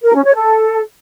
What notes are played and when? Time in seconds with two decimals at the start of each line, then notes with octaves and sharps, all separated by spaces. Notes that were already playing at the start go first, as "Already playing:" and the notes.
0.04 A#4
0.14 C#4
0.25 C#5
0.35 A4